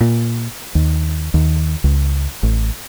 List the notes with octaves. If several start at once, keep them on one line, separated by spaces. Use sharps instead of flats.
A#2
D#2
D#2
C#2
A1